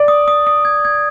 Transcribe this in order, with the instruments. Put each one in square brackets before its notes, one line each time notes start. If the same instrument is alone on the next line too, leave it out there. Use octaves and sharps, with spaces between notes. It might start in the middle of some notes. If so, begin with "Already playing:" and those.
Already playing: [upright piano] D5
[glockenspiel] D#6
D#6
D#6
G#6
G#6